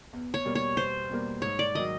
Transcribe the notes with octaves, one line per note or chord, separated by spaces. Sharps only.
E2
C#5
B2 G3 A#3
C#5
E2 C5
B2 G3 A#3
G#2 C#5
D5
D#3 F#3 D#5